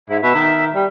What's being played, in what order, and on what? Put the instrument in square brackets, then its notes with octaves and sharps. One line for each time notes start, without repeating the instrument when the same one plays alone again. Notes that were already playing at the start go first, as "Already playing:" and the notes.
[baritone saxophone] G#2 [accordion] E4
[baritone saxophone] B2 [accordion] E5
[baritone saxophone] D#3
G3